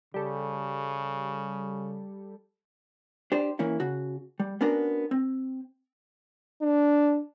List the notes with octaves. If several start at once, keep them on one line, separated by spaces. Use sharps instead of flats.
C#3 G3 A4
D4 G4 C5
E3 A#3 C#4 E4
C#3 F#4
G3
B3 C#4 D4 F#4 A#4
C4
D4